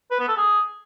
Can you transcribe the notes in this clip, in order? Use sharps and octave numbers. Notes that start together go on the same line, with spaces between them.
B4
B3
A4
G#4